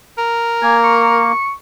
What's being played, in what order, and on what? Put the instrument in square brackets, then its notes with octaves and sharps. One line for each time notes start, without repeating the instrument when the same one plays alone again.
[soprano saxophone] A#4
[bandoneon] A#3 [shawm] G#5
[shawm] C#6